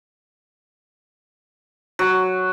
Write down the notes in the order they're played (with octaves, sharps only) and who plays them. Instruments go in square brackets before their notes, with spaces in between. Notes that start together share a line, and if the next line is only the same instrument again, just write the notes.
[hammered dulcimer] F#3